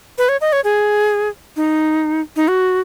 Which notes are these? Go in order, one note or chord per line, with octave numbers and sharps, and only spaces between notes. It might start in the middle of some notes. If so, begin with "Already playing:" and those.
B4
C#5
D#5
C#5
G#4
D#4
D#4
F#4